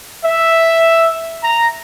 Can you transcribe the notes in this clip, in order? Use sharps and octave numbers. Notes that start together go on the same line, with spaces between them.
E5
A#5